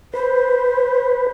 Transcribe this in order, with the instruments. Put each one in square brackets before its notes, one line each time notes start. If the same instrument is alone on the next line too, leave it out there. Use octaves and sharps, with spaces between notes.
[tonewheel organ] B4 [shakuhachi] C5